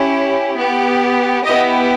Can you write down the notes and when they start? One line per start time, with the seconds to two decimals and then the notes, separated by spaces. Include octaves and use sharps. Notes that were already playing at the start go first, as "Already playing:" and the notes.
Already playing: C#4 E4 G4
0.55 B3 G4
1.44 B3 E4 G4 D#5